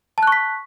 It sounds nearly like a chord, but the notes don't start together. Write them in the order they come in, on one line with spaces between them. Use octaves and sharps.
A5 F#6 C#6 B6